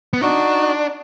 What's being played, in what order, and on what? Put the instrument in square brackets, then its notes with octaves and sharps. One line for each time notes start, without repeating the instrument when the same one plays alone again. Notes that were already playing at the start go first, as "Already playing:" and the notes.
[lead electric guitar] B3
[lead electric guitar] D4 [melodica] D#4 F#4